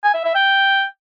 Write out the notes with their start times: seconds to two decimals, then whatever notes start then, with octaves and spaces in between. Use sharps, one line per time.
0.04 G#5
0.14 E5
0.25 E5
0.35 G5